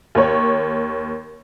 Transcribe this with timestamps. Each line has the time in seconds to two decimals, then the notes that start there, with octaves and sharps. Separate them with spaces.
0.15 D#2 C#5